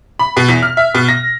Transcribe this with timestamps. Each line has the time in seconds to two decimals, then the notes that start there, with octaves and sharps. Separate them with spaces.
0.19 B5
0.37 B2
0.49 E2
0.63 F6
0.77 E5
0.95 B2
1.08 A#6